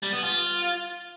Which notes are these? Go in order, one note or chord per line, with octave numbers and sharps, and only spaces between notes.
G3
B3
F4